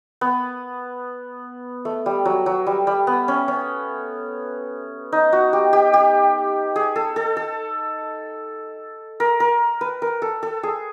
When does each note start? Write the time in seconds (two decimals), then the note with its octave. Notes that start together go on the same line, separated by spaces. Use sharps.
0.21 B3
1.85 A3
2.06 G3
2.25 F#3
2.46 F#3
2.66 G3
2.87 G3
3.07 B3
3.28 C#4
3.48 C#4
5.12 D#4
5.33 F#4
5.53 G4
5.73 G4
5.94 G4
6.76 G#4
6.96 A4
7.16 A4
7.37 A4
9.20 A#4
9.40 A#4
9.81 B4
10.02 A#4
10.22 A4
10.43 A4
10.63 G#4